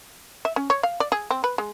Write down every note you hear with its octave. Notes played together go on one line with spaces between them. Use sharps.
E5
C#4
C#5
F5
D5
G#4
C4
B4
G#3